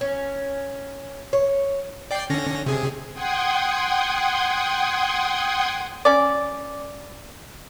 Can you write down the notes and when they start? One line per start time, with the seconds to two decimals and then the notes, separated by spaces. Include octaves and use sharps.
0.01 C#4
1.33 C#5
2.11 D5 G5 C7
2.30 D3 C#4 A#6
2.66 C3 G#4
3.13 F#5 G5 C6 D#6 G#6
6.05 C#4 D5